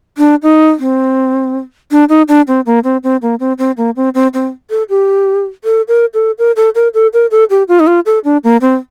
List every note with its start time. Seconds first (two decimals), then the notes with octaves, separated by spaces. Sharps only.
0.18 D4
0.43 D#4
0.79 C4
1.91 D4
2.09 D#4
2.28 D4
2.48 C4
2.66 A#3
2.84 C4
3.03 C4
3.22 A#3
3.40 C4
3.58 C4
3.77 A#3
3.96 C4
4.15 C4
4.34 C4
4.70 A4
4.89 G4
5.64 A4
5.88 A#4
6.14 A4
6.39 A#4
6.56 A4
6.75 A#4
6.94 A4
7.13 A#4
7.31 A4
7.50 G4
7.68 F4
7.80 D#4
7.87 F4
8.06 A4
8.24 D4
8.44 A#3
8.61 C4